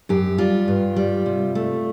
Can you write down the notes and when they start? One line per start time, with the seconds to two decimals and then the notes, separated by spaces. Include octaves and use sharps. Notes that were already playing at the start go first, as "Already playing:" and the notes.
0.09 F#2 G4
0.38 G3 F4
0.68 G2
0.96 G3
1.26 C3
1.55 A3